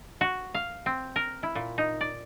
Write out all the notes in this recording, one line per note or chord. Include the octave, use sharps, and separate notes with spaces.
F#4
F5
C4
A#4
E4
A#2
D#4
D5